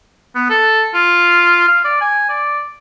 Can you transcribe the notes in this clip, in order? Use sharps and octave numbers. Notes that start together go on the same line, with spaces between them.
B3
A4
F4
F5
D5
G#5
D5